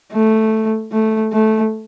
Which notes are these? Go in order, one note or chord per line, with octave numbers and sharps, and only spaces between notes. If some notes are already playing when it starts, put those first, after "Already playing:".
A3
A3
A3